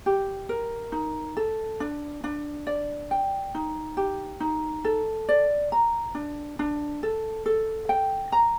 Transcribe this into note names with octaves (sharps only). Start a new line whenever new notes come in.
G4
A#4
D#4
A4
D4
D4
D5
G5
D#4
G4
D#4
A4
D5
A#5
D4
D4
A4
A4
G5
A#5